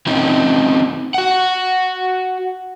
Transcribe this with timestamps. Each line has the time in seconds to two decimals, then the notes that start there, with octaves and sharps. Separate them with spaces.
0.06 E3 C4 C#4 D#4 F4
1.14 F#4 F#5